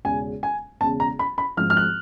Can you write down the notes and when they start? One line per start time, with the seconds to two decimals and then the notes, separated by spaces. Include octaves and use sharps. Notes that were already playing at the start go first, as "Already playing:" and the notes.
0.04 E1 E2 C#3 G#5
0.43 G#5
0.80 E1 E2 C#3 A5
1.00 A#5
1.19 B5
1.38 B5
1.57 G#1 G#2 F3 F6
1.70 F6
1.77 F#6